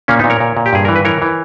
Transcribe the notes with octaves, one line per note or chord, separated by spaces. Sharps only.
A#2 A#3 C#4
A#2 B3 D#4
A#4 C#5
A#2
A#2
G4
G2 G#4
E3 A#4
B4
E3 A#4 C#5
E3